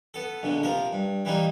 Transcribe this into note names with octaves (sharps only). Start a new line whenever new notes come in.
B3 A4
A#1 B2 D3
C3 F3 A#4
G2
E3 G3 A#3 D#4